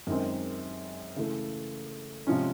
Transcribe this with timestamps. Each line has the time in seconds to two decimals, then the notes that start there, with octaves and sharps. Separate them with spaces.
0.07 F#2 D#3 G#3 C4
1.16 C#3 E3 A3
2.27 C3 F3 G#3 C#4